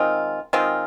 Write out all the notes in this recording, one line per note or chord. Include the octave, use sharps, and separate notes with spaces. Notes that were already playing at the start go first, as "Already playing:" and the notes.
Already playing: D#3 G#3 C4 F4
D#3 G#3 C4 F4